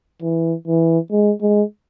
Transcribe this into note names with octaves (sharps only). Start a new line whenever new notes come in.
E3
E3
G#3
G#3